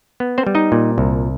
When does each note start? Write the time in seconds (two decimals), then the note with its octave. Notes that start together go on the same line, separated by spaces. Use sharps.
0.20 B3
0.38 C4 C5
0.47 G3
0.55 D#4 D#5
0.72 A#2
0.98 C2